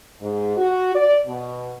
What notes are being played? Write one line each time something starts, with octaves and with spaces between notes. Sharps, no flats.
G#2
F#4
D5
B2